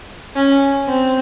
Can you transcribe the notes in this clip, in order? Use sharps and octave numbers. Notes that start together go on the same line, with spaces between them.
C#4
C4